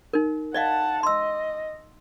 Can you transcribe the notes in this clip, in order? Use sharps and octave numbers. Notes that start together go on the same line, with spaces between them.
D#4 A#4
D5 D#5 F5 F#5 A5
D#5 C6 E6